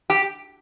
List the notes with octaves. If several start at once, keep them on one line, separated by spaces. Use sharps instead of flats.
G4